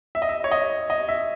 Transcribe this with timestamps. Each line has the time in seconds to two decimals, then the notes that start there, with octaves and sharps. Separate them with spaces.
0.15 E5
0.22 D#5
0.29 E5
0.44 C#5
0.51 D#5
0.90 D#5
1.09 E5